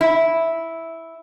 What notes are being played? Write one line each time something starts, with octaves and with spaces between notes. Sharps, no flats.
E4